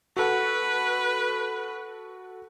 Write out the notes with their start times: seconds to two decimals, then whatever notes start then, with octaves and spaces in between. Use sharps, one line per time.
0.17 F#4 A4 B4 F#5